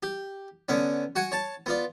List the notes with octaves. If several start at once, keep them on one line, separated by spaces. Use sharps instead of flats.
G4
D3 B3 C#4
F#4 F#5 G#5
C#5 A5
B3 F4 D5